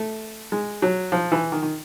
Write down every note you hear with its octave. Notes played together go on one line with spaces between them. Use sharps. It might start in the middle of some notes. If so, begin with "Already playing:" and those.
Already playing: A3
G#3
F#3
F3
E3
D#3
D#3